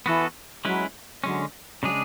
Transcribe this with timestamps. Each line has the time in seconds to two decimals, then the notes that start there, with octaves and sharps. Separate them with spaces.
0.06 E3 B3 F#4 A4
0.65 F#3 G#3 C#4 E4 B4
1.24 D3 F#3 G#3 C#4
1.83 C#3 F#3 G#3 D4 G#4